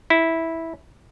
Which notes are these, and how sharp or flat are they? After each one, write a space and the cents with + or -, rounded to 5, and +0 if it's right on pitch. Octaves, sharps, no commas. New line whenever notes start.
E4 -10